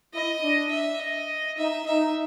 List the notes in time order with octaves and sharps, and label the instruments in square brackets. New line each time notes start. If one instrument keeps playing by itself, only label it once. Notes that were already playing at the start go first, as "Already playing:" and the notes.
[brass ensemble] E4 [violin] D#5
[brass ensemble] D4
[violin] E5
D#5
[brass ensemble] D#4 [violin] E5
[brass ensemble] D#4 [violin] E5